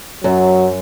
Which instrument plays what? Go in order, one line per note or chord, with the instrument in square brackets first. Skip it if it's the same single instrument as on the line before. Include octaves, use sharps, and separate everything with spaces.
[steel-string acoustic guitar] F#2 [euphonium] F#3